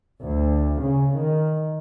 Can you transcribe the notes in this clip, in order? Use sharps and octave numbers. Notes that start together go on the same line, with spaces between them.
D2
C#3
D#3